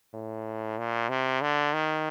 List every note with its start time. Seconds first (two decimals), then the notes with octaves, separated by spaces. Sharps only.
0.14 A2
0.79 A#2
1.09 C3
1.41 D3
1.74 D#3